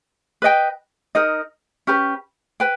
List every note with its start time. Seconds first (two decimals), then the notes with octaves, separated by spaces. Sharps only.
0.42 B4 D#5 G5
1.15 D#4 A#4 D#5
1.87 C#4 G4 B4
2.60 B4 G5